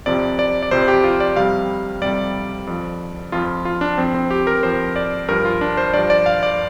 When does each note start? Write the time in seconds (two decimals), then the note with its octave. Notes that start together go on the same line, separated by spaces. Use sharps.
0.06 F2 C3 F3 D5
0.39 D5
0.63 D5
0.71 F2 C3 F3 C5
0.88 G4
1.04 F4
1.20 D5
1.36 F2 C3 G3 F5
2.02 F2 C3 G3 D5
2.67 F2 F3
3.32 F2 F3 F4
3.65 F4
3.81 D4
3.98 F2 F3 C4
4.14 C4
4.31 G4
4.47 A#4
4.63 F2 F3 C5
4.96 D5
5.29 G2 F3 A#4
5.45 F4
5.61 D4
5.77 C5
5.94 G2 F3 D5
6.10 D5
6.26 F5
6.43 D5